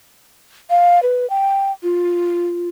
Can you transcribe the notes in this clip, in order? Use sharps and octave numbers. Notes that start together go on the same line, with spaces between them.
F5
B4
G5
F4